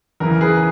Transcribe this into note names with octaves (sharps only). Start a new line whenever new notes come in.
E2 C#3 E3 A#4
G#4 B4